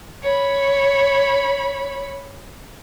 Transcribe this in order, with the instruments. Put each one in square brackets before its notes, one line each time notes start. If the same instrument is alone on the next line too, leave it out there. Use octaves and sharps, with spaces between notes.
[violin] C#5 B5